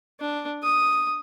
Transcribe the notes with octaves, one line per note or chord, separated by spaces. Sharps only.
D4
D#6